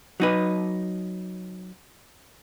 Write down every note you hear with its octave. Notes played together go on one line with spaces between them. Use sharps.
F#3 D#4 B4